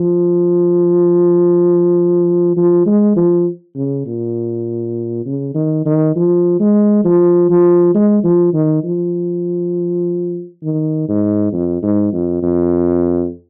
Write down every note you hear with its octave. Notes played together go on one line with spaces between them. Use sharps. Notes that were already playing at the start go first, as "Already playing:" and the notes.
Already playing: F3
F3
G#3
F3
C#3
A#2
C#3
D#3
D#3
F3
G#3
F3
F3
G#3
F3
D#3
F3
D#3
G#2
F2
G#2
F2
F2